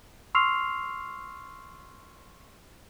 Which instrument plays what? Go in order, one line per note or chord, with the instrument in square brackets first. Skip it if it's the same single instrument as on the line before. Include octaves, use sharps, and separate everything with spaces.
[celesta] C6 C#6 E6 F6 C7 F7